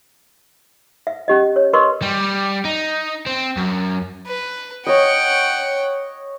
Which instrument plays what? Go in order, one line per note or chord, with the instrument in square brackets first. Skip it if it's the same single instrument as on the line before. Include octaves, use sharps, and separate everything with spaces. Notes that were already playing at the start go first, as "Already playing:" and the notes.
[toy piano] E5
C#4 G4 D#5
C#5
A#4 B4 D#5 C6 C#6
[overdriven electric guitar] G3
D#4
C4
F#2
[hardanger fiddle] B4
[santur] C#5 D#5 [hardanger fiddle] F#5 G5